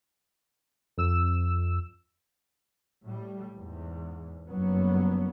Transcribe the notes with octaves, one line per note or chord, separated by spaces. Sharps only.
F2 E6 E7
A2 G3
E2 G#2
F#1 G2 F#3 B3